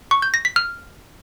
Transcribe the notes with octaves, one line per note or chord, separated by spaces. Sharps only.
C#6
G6
A#6
B6
F6